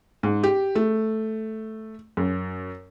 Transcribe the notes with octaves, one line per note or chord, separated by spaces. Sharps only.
G#2
G4
A3
F#2